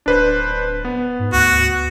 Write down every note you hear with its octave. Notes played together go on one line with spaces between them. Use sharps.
D1 D4 B4 C5
B3
G#2
D2 F#4